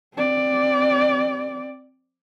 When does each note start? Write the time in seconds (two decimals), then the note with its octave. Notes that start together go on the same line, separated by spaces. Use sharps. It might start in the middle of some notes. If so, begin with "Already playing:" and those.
0.15 C4 D5